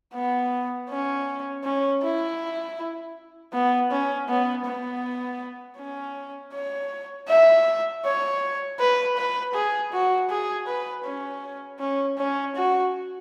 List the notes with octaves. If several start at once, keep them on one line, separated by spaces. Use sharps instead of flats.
B3
C#4
C#4
E4
B3
C#4
B3
B3
C#4
C#5
E5
C#5
B4
B4
G#4
F#4
G#4
B4
C#4
C#4
C#4
F#4